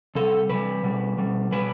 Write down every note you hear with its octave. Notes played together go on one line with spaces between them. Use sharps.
C3 G3 A4
C3 G3 B4
B2 G3
B2 G3
B2 G3 B4